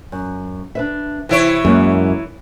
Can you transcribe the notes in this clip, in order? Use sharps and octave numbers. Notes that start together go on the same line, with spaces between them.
F#2
D4 B4 E5
C3 E3 E4 C#5
F#2 G#3 A#3 F#4